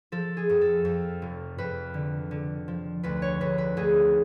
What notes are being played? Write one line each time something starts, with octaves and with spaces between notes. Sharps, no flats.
F3 A4
G#4
F2
A4
F2
F1
F2 B4
D3
D3
F3
D2 B4
C#5
D2 B4
B4
D2 G#4